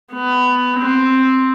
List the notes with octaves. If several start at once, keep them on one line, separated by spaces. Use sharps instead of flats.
B3
C4